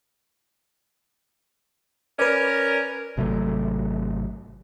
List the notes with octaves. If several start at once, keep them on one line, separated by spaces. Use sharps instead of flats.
C#4 A#4 B4 D5
G#1 C3 F#3 A3